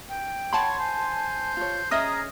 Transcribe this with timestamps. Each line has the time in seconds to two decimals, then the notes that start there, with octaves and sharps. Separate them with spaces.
0.09 G5
0.53 C#5 F#5 A5 B5 C6
0.79 C5 G#5
1.57 F4 C#5
1.91 C#4 G#4 D#5 E5 A#5 D#6 F6 A#6